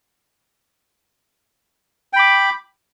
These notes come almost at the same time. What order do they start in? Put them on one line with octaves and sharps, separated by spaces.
G5 B5 D6